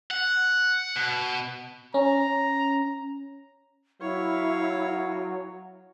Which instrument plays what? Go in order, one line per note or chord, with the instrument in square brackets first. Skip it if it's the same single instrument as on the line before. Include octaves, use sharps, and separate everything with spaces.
[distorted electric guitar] F#5
B2
[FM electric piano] C#4 [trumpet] A#5
[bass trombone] F#3 [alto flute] E4 [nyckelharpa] C#5 F5